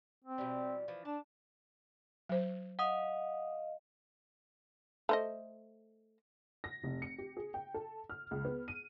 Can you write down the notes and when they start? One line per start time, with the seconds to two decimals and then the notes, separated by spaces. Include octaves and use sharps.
0.24 C4
0.38 B2 E3 G3
0.88 E3 F3
1.05 D4 A5
2.29 F#3 C5
2.79 D#5 F5 F#5 D#6
5.09 A3 C5 D#5
6.64 A#6
6.84 F1
7.02 C#7
7.18 G4
7.37 G#4
7.54 G5
7.74 A4
8.10 F6
8.31 C#2
8.45 B3
8.68 D#7